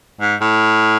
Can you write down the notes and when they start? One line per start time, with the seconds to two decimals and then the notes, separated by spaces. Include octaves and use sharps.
0.21 G#2
0.41 A2